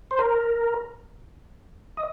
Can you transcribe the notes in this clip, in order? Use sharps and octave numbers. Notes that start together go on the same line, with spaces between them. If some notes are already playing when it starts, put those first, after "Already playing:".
C5
A#4
D#5